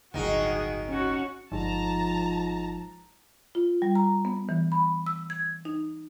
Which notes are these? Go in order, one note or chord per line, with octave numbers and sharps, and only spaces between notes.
D1 G1 D#3 D#4 F#4 G#4
C#4 F#4
G1 G#2 F3 A5 A#5
F4
G3
A#5
B3
E3
B5
E6
G#6
D#4